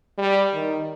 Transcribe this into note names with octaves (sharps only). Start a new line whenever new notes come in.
G3
D#3